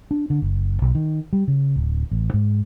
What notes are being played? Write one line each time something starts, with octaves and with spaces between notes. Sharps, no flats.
D4
D3
F#1
B1
D#3
G3
C#3
D1
A1
G#2